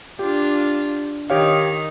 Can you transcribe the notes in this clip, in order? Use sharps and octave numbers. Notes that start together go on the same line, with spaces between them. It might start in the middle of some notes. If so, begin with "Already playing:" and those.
D4 F4 G4
D#3 D#4 G4 C#5 F5